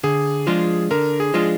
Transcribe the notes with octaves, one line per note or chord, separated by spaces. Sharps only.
D3 G#4
F3 G#3 D4 F4
D3 A#4
G#4
F3 G#3 D4 F4